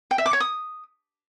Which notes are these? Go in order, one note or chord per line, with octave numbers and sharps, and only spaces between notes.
G5
E5
D6
C#5
D#6